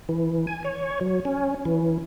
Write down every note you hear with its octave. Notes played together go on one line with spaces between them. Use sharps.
E3
G#5
C#5
F#3
C#4
E3